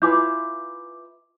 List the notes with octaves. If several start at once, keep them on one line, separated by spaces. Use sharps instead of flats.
E4 F4 B4 G#5 D6 G6